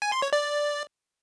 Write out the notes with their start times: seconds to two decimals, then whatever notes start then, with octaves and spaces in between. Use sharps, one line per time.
0.02 G#5
0.12 C6
0.22 C#5
0.33 D5